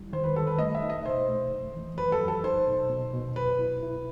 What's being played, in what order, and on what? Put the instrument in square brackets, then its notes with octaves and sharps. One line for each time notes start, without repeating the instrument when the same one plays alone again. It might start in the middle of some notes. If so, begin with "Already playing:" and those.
Already playing: [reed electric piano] D#2 G3 E4
[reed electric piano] D#3 [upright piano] C5
[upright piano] B4
[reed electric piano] G3 [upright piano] A4
[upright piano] B4
[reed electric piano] A3 [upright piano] D#5
[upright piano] E5
[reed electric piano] D#4
[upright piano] D#5
[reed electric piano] B2 [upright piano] C5
[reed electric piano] A3
F#2
E3
[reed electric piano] F#2 [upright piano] B4
[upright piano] A4
[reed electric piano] F#2
[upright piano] A4
[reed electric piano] D#4 [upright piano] C5
[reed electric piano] B2
B2
B2
[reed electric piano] F#2 [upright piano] B4
[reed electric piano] E4
E4